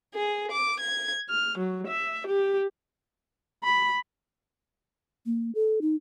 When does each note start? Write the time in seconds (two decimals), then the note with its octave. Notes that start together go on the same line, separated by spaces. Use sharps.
0.15 G#4
0.51 D6
0.80 G#6
1.29 F6
1.59 F#3
1.88 E5
2.29 G4
3.64 B5
5.26 A#3
5.55 A4
5.82 D#4